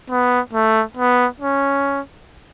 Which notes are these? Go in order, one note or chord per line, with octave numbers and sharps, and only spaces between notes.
B3
A3
B3
C#4